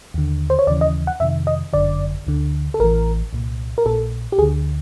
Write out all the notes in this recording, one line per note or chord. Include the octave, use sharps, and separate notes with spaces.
D#2 D3
C5
C#5
D#2 C#3 E3 D5
D#5
F#5
F2 C3 D#3 E5
D#5
G1 F#2 D3 D5
D2 D3
A4
A1 A2 E3 A#4
C2 A#2
A#4
A#1 A#2 A4
G4
D2 D3 G#4